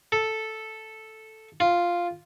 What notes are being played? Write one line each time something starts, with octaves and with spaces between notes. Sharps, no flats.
A4
F4